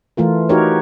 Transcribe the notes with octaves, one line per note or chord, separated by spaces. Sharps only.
E3 A3 F4 A#4
D#4 F#4 G4 A#4 C#5